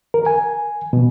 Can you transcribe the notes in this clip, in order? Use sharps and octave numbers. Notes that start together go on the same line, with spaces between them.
A#4
G#5
B2